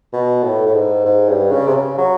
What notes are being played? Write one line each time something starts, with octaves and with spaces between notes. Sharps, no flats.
B2
A2
A2
G#2
G#2
G2
C#3
C3
C#3
F#3